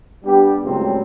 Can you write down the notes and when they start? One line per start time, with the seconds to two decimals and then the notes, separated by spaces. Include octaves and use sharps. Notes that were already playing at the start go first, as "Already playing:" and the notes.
0.25 G3 B3 D4 G4
0.63 C#2 A2 C#3 F#3 G3 C4